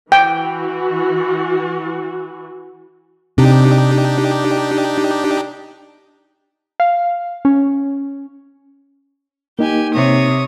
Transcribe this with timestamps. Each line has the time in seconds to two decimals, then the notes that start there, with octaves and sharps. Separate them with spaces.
0.12 E3 F#4 G5
3.38 C3 D4 D#4 G4
6.80 F5
7.45 C#4
9.59 A#3 D#4 G4 G#5
9.94 C3 C#5 D#6